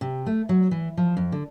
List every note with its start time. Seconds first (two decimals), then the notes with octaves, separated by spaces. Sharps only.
0.01 C3
0.26 A3
0.49 F#3
0.71 E3
0.97 F3
1.17 F2
1.32 D3